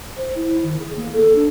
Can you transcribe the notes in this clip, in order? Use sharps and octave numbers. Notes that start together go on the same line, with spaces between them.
C5
E4
D#3
G#4
A#3
A4
D4